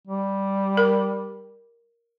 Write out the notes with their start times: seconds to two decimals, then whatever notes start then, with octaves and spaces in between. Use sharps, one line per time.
0.07 G3
0.77 A#4